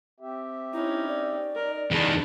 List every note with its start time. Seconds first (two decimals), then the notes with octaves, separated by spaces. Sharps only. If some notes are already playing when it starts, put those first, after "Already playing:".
0.20 C4 G4 E5
0.73 C#4 D#4 E4
1.08 D5
1.55 D#4 A#4
1.91 E2 D#3 G#3 G#4 A5